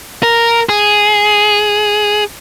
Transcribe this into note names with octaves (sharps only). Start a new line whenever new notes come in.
A#4
G#4